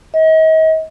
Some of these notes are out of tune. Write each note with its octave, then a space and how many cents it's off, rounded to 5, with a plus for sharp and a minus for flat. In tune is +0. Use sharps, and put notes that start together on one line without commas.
D#5 +40